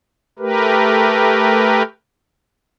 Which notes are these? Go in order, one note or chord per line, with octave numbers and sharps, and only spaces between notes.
A3 G4 A#4 B4